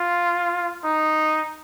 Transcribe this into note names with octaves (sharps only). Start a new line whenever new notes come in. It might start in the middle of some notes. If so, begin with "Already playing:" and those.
Already playing: F4
D#4